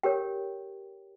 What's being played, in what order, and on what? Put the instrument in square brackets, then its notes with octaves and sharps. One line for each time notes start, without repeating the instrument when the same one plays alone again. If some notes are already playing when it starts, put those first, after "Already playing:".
[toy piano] G4 A#4 C#5 G5